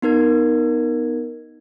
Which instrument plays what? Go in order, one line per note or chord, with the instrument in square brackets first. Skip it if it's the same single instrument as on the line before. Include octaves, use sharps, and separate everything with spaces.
[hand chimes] B3 D#4 A#4 G#6